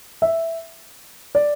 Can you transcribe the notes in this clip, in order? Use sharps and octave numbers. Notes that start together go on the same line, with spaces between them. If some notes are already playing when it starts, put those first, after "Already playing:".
E5
D5